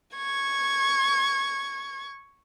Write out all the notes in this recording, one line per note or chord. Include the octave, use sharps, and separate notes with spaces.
C#6 G#6